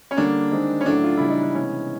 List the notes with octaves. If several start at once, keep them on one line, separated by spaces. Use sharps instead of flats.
C#4
D3 G3 A#3 D4
D#3 G#3 C4
C#4
A2 F#3 A3 D4
F4
C#3 E3 G3 E4
D#4
D4
C3 E3 G#3 B3 C#4